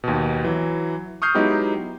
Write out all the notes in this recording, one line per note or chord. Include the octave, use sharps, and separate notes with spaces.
D#2 B2
E3 F#3
C#6 D#6 F6 G6 C7
F#3 G#3 B3 D#4 E4 G4